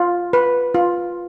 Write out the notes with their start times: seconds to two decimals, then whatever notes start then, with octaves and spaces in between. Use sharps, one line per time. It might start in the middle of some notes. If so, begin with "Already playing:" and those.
Already playing: F4
0.33 B4
0.74 F4